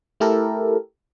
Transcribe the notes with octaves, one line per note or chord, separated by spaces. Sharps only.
A3 E4 G4 A4 A#4